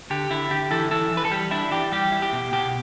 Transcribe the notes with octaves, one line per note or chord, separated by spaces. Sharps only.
D3 G4
D3 E4
D3 G4
E3 E4 A4
E3 E4 A4
E3
B4
A4
G3 G4
D4 E4
E3 G4
G3 G4
E4
G4
B2
B2 G4